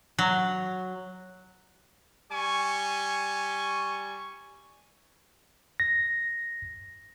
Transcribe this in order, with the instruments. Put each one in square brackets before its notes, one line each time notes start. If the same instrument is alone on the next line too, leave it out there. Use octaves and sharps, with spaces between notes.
[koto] F#3
[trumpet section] G3 G#5 C#6
[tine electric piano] A#6